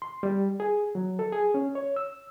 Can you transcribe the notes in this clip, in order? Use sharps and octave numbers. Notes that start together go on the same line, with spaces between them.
C6
G3
G#4
F#3
A4
G#4
C#4
C#5
E6